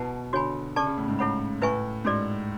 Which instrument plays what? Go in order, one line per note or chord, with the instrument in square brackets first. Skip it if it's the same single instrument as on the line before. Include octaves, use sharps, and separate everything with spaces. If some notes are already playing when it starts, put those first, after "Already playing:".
Already playing: [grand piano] B2 [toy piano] E4 B4 F#5 A5
[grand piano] D3 [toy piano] F#4 C#5 G#5 B5
[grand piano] C#3 [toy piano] A4 D5 A5 C#6
[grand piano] C#3
A2
G#2
[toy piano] E4 A4 C#5 F#5 B5
[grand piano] A2 [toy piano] E4 B4 E5 G#5 C#6
[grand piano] G#2 [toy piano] C#4 F#4 A4 D5